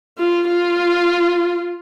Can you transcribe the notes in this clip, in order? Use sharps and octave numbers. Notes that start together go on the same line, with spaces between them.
F4
F4